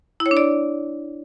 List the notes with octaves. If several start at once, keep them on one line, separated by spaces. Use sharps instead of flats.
E4
C#5
D4
D5